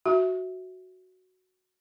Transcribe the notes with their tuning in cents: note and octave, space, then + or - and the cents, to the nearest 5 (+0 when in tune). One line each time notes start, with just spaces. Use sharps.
F#4 +0 E5 -10